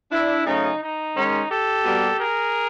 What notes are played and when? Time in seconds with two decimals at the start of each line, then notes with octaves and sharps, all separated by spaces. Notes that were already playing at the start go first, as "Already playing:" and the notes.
0.11 D4 E4
0.45 C#3 F#3 A3 C#4 D#4
0.81 D#4
1.15 D#3 G#3 C#4
1.50 G4 A4
1.85 B2 G3 A#3
2.19 G#4 A#4